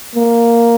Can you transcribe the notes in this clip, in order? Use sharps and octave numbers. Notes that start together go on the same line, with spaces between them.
A#3